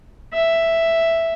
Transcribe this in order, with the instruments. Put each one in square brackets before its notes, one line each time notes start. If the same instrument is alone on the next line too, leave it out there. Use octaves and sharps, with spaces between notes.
[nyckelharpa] E5